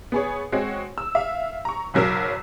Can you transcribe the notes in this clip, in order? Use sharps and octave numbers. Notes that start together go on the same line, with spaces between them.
B3 G#4 C#5
G#3 C4 F#4 C#5
E6
E5 F5
A#5 C#6
F#1 B1 F#3 A#4 E6